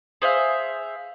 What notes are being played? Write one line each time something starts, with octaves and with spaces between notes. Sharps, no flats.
G#4 C5 E5 F5